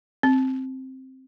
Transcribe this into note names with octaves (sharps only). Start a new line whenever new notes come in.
C4